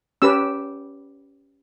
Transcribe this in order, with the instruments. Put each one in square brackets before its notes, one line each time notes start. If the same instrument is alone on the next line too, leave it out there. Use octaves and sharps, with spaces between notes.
[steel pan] C#4 G4 B4 E6